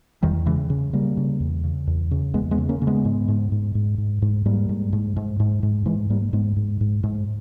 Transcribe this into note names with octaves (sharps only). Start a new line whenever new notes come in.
E2 D#3 G3
C#3 E3 G#3
C#3
C#3 G3 A#3
C#3
E2
C#3
E2
C#3
E2 G#3 B3
G#3 B3
C#3
A#3 C#4
C#3
G#3 B3
G#2
G#2
G#2
G#2
G#2
G#2
G#2 G3 A#3
G#2
G#2
G#2
G#2
G#2
G#2 E3 G#3
G#2 G3 A#3
G#2 G#3 B3
G#2
G#2
G#2